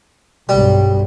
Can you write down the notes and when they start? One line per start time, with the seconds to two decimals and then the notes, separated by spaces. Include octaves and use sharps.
0.49 B1 G2 G3